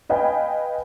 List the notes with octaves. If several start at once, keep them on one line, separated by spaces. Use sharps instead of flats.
B4 D#5 F5 G5 G#5 B5